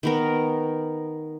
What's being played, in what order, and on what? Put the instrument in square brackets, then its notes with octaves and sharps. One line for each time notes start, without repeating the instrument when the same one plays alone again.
[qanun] D#3 B3 A#4